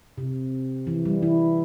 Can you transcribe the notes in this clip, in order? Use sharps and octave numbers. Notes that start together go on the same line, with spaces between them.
C3
E3
G3
E3 E4